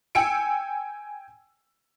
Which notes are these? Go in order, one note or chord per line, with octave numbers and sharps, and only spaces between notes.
G5 G#5 E6 C#7 D7